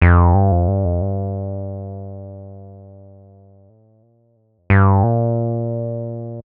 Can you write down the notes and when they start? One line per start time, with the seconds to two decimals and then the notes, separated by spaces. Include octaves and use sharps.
0.02 F2
0.34 G2
0.52 F2
0.68 G2
0.85 F2
1.02 G2
3.69 A2
4.03 A#2
4.36 A2
4.58 F2
4.70 G2
5.04 A#2